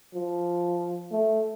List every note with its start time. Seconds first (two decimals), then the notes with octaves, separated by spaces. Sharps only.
0.15 F3
1.12 A3